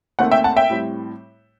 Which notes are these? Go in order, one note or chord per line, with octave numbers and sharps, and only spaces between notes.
D#2 D#3 A3 C4 F#5
E5 G5
F#5 A5
E5 G5
A2 G3 C4